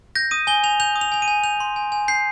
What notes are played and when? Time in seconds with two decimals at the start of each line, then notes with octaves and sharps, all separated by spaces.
0.15 G6 A#6
0.31 D#6 D#7
0.47 G#5 G7
0.64 G#5 F7
0.80 G6 F7
0.96 D#6
1.01 F7
1.12 G#5 F7
1.22 D#7
1.28 G#5
1.44 G6 F7
1.60 C6
1.76 G#5
1.92 G#5
2.08 G6 C7